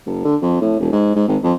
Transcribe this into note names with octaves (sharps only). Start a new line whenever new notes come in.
F#1
D3
F2
A2
E1
G#2
G#2
G#1
F2